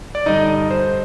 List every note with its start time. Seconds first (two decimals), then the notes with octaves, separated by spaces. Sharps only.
0.15 D5
0.26 G2 D3 G3 D#4 D#5
0.71 C5